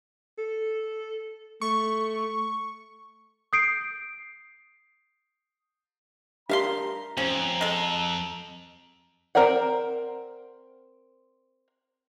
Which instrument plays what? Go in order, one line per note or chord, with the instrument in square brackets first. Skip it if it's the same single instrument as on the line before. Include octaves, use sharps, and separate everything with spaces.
[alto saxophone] A4
[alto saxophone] A3 [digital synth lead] C#6
[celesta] D#6 G6 C7 D7
[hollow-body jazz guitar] D4 G4 A#4 [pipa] E5 F5 C6 [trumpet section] A#5
[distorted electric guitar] F2 [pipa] C#4 [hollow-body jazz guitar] C5 G#5
[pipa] G#3 A4
[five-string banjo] C4 A#4 C5 D5 F#5